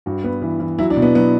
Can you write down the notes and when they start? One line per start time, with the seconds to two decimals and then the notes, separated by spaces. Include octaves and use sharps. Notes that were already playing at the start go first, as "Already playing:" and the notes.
0.06 G2 F#4
0.24 B3
0.42 E3
0.60 E3
0.79 F#3 E4
0.90 D4
0.97 B2
1.02 B3
1.15 F#3 B3